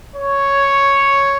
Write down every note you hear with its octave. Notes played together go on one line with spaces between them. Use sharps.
C#5